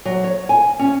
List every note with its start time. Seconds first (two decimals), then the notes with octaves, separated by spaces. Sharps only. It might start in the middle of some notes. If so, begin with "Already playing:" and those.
0.05 F#3
0.24 C#5
0.49 G#5
0.79 C#4